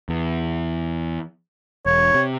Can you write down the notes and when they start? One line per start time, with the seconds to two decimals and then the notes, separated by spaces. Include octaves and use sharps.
0.09 E2
1.86 E1 C#5
2.14 C3